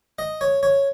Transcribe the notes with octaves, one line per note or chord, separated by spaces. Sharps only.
D#5
C#5
C#5